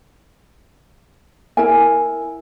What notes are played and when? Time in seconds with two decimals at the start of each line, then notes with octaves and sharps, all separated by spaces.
1.57 E4 A#4 G#5